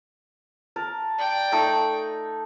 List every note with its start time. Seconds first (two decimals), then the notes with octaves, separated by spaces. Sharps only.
0.76 A#4 A5
1.18 D5 G5
1.52 A3 D#4